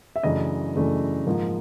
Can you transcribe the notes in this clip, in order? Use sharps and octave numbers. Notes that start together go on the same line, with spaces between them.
E5
F#2 C#3 E3 A3 D4 D#5
F#2 C#3 E3 A3 D4
G#2 F3 A#3